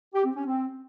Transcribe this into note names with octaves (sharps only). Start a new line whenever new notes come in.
G4
C4
C#4
C4